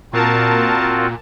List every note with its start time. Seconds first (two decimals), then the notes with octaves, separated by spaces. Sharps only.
0.13 A#2 C4 F4 F#4 A#4 A5